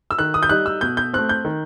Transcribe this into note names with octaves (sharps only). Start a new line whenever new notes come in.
E6
D#3 F#6
D#6
G6
G3 D#4 F#6
E6
B2 G6
G6
A3 C4 F#6
G6
D#3